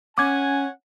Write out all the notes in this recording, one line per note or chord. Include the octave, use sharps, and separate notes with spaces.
C#4 C#5 F#5 G#5 D6 G#6